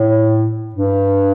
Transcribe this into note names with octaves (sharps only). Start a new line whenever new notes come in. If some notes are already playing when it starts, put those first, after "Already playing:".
Already playing: A2
G2